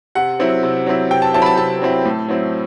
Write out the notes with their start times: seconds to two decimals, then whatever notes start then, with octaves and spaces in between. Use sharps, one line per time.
0.15 C3 F#5
0.39 F#3 C4 E4
0.63 C3
0.86 F#3 C4 E4
1.11 C3 G5
1.22 A5
1.34 F#3 C4 E4 A5
1.42 B5
1.46 A5
1.57 C3 A5
1.82 F#3 C4 E4
2.05 A2
2.28 F#3 C4 E4